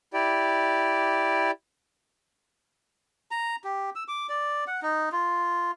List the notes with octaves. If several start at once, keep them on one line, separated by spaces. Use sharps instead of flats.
E4 G4 D5
A#5
G4
E6
D6
D5
F#5
D#4
F4